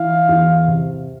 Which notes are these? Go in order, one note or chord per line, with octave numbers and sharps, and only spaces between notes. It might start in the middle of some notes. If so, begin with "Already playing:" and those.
Already playing: E3 F5
E2
C3